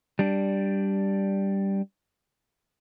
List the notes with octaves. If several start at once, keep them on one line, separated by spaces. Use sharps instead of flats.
G3 D4